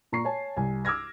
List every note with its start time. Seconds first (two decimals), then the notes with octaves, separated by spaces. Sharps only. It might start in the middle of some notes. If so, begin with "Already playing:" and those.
0.12 A#2 A#5 C#6 C7
0.25 C#5 G#5 A5
0.57 C2 G#5
0.85 D6 E6 F6 G#6 A#6